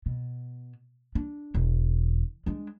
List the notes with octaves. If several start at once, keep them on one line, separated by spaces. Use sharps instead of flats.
B2
D4
E1
G#3 D4